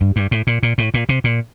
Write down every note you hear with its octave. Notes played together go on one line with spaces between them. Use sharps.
G2
G2
A2
A#2
A#2
A2
A#2
C3
A#2